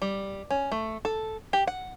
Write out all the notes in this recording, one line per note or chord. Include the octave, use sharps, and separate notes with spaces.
G3
C#4
A3
A4
G4
F#5